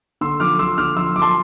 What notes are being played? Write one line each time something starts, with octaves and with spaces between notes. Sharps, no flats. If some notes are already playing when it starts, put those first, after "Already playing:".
D3 C6 E6
F3 D6 F6
F3 C6 E6
D3 D6 F6
F3 C6 E6
F3 D6
A5 C6